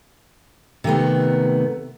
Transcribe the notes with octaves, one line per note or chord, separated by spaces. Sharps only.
C3 D#3 A3 B3